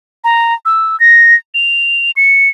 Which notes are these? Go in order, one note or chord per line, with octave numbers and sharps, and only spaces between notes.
A#5
E6
A#6
F7
C#7